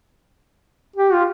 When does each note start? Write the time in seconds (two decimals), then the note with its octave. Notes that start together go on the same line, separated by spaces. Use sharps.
0.96 G4
1.12 F4